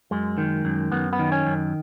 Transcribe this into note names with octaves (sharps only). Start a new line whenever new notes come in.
F#2 G#3
D#3
F#2
F#2 B3
B3
D#3
C#4
F#2